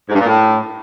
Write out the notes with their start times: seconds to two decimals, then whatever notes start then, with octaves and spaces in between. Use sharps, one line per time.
0.09 G#2
0.14 G2
0.20 A#2
0.26 A2